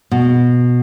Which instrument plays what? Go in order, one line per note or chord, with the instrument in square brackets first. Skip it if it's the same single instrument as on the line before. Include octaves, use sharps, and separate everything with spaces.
[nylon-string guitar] B2